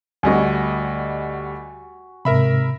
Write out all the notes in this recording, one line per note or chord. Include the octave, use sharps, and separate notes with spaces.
D2 G3 F#4 D#5 G#5
G#2 C3 A#4 E5 B5